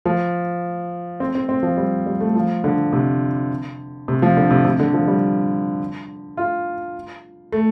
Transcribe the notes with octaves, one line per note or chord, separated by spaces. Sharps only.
F3
C4
C4
C4
F3
G3
G3
A3
F3
D3
C3
C3
F3
D3
C3
C3
D3
F3
G3
F4
A3